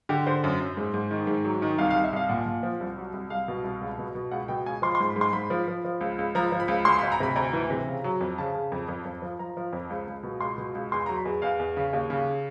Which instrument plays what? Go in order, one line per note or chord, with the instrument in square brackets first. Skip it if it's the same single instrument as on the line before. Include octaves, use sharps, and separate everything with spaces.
[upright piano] D3 G4
D3 C5
F#2
F#2
G#2
G#2
D#3
G#2
F#3
D#3
C2 F5
F5
C2
E5
C2 F5
A#2 F#5
A#2
F3
C2
F#3
C2
C2 F5
B2
C2
C#2
B2
B2
C#2 F#5
B2 G5
C#2 G#5
F3 C6
C6
G#2
B5
G#2
C6
G#2 B5
F3
F3
F3
C#2
C#2
F3 A#5
F3
B5
C#2
D2 C6
B5
D2
A#5
C3 B5
D2 A#5
E3
C3
C#3
F#3
F2
C#3 A5
C#3
F2
F2
F2
F3
F3 A#5
F3
F2
C#2
C#2
B2
C#2 C6
B2
C#2
E2 C6
F#3 A#5
B5
E2
E2 F5
E2
C#3
D#2
C#3